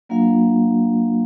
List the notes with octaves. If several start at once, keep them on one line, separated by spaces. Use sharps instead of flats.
F#3 A#3 D4 F4 F5